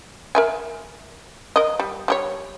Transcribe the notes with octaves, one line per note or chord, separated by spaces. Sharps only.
A#4 E5 G#5
A#4 D#5
G3
G3 G4 C#5